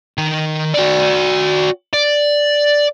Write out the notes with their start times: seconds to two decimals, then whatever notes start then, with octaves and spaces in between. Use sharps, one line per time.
0.18 D#3 D#5
0.74 F#4 D5
1.93 D5